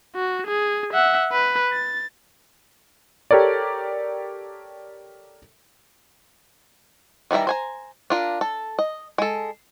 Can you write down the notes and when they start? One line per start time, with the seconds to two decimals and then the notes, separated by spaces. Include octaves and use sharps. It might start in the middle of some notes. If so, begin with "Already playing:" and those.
0.15 F#4
0.47 G#4
0.93 E5 F#5
1.32 B4
1.72 A6
3.31 G4 A4 A#4 C#5 D5
7.31 D#3 E3 G3 E5 A#5
7.47 C5 G#5 A#5
8.10 D4 F4 A#4
8.41 A4
8.79 D#5
9.18 G#3 A4